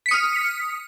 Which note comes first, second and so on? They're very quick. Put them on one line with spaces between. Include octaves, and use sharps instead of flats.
B6 C#7 D#6 F6